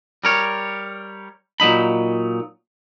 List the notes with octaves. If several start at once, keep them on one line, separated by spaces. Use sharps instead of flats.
G3 A#4 C#5
A#2 F#3 D#4 B5